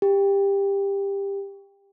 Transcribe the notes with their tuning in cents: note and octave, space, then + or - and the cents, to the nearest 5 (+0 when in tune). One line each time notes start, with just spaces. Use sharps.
G4 +20